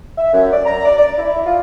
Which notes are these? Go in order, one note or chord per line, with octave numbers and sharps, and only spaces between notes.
E5
F#2
D5
A#5
D5
D5
E4
F4